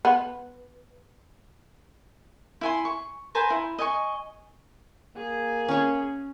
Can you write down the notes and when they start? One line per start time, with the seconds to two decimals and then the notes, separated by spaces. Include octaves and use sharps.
0.05 B3
2.61 E4 G#5 C6
2.85 C#6
3.35 B4 C5 G#5 A#5
3.50 E4
3.79 D#5 G#5 C#6
5.16 A#3 G#4
5.68 C#4 C#5